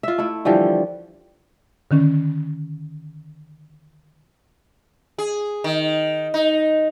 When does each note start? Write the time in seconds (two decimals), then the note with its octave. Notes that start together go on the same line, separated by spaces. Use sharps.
0.03 F4 E5
0.18 A3 E4
0.45 D3 E3 F3 G3
1.91 D3 D#3 C#4
5.18 G#4
5.64 D#3
6.34 D#4